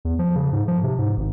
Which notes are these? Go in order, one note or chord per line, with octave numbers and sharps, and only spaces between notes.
E2
F3
C#3
G#2
F3
C3
G#2
G#1